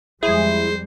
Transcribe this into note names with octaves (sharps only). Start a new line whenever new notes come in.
F2 G3 G#3 E4 G#4 C5